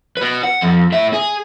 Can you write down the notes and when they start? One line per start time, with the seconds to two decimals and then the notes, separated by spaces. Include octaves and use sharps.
0.17 F#4 B4
0.43 F#5
0.61 F2
0.92 A2 E5
1.13 G#4